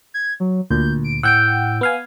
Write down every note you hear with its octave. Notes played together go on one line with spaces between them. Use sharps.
G#6
F#3
D2 A#2 G6
D7
A2 F#5 G5 E6 G6 D7
B3 F5 G#5